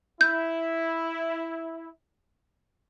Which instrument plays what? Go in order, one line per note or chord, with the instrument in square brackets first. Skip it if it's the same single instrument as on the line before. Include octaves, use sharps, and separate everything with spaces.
[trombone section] E4 [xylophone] G6